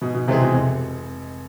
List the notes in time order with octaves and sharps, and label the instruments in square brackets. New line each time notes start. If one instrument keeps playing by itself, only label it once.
[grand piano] G#2 [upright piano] B2
[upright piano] B2
[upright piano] C3 [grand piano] E3 G#3 C4 G#4
[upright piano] B2
[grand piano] F1 [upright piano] C3